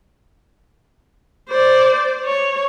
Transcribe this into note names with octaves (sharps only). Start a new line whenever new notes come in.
C5 D5
C#5